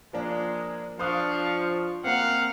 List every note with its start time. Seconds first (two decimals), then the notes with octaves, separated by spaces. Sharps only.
0.13 F3 G#3 A#3 D4
0.99 F3 D4 C5 F5 C#6 D#6 F#6
2.04 A#3 C4 F5 F#5